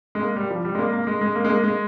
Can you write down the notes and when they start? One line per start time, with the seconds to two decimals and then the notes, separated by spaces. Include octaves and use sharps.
0.15 G#3
0.22 A#3
0.36 G3
0.50 F3
0.65 G3
0.75 G#3
0.79 A#3
0.93 A#3
1.07 G#3
1.21 G#3
1.35 A#3
1.45 G#3
1.49 A#3
1.64 G#3